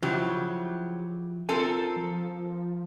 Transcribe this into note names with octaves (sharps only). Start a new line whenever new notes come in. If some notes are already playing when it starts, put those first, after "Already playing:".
C#3 F3 F#3 E4 G4
C4 F4 A4 A#4 G#5
F3